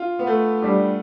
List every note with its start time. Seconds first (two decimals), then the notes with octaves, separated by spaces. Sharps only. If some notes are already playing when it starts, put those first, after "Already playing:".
Already playing: F4
0.19 B3
0.27 A3
0.62 G3 D4 G4